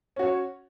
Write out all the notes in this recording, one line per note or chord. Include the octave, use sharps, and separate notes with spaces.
C#4 F#4 C#5